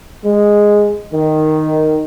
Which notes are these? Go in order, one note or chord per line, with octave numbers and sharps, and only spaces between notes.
G#3
D#3